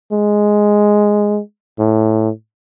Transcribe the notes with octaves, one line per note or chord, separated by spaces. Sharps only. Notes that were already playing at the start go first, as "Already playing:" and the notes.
G#3
A2